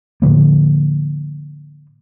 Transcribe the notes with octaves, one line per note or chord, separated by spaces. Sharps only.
A2 D3 F3 A#3